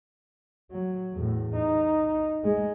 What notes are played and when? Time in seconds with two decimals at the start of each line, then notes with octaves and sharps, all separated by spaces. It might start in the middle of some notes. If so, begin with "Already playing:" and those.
0.71 F#3
1.14 E2 A2
1.55 D#4
2.44 G#3